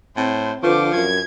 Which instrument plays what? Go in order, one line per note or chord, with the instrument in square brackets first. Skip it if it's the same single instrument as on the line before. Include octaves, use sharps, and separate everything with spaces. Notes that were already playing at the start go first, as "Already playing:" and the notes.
[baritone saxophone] A2 [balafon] C4 [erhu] C5
[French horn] D3 [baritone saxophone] F3 [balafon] F4 B4 [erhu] D6
[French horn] F#2 [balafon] F4 [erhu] G#6